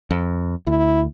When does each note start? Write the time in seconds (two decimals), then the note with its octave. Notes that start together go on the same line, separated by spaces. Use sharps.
0.11 F2
0.67 D2 E4